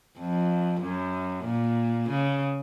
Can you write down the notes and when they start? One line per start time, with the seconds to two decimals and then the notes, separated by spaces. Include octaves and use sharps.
0.19 F2
0.81 F#2
1.45 A#2
2.09 C#3